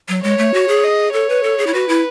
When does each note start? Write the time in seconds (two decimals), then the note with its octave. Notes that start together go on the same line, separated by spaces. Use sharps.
0.09 F#3
0.23 G#3 C#5
0.38 A3
0.54 F#4
0.68 G#4
0.84 D#5
1.13 A4 C#5
1.29 B4
1.43 A4
1.58 G#4
1.67 E4
1.74 F#4 B4
1.89 E4